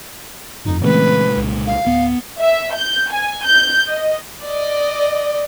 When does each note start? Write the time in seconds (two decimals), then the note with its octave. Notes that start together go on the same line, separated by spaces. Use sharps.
0.65 G1 F2 D#4
0.83 A#2 C#3 E3 G#3 A3 C4 B4
1.37 C2
1.67 F5
1.86 D1 B3
2.40 E5
2.73 G6
3.11 G#5
3.45 G6
3.88 D#5
4.41 D5 D#5